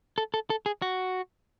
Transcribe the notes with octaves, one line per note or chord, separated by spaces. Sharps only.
A4
A4
A4
G#4
F#4